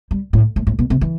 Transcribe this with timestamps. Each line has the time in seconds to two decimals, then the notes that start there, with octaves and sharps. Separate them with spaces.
0.11 G3
0.33 A2
0.56 A2
0.67 A2
0.79 B2
0.90 C3
1.01 E3